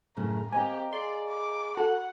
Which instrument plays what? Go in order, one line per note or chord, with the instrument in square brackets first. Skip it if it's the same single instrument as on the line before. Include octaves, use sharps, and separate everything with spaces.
[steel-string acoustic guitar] F#2 A2 C#3 [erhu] A#5
[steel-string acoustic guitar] A#3 D#5 A#5 [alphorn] C4 [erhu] G4 [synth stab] G#5
[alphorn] G#4 [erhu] D5 [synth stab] C6
[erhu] D6
[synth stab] F#4 A4 [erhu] F#5